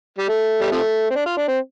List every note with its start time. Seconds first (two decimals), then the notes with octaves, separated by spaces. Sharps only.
0.18 G3
0.29 A3
0.61 G3
0.72 C3 F3 A3
1.10 C4
1.15 D4
1.26 F4
1.37 D4
1.48 C4